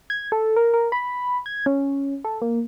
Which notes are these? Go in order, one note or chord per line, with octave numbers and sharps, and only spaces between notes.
G#6
A4
A#4
A#4
B5
G#6
C#4
A4
A#3